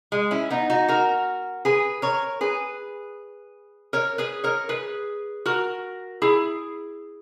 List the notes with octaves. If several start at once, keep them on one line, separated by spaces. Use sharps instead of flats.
G#3
C#4 E4
B3 D#4
D#4 F#4
F#4 A#4
G#4 B4
A#4 C#5
G#4 B4
A#4 C#5
G#4 B4
A#4 C#5
G#4 B4
F#4 A#4
E4 G#4